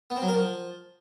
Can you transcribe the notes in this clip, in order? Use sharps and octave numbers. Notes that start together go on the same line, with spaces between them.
B3
C4
F#3
A#4
F3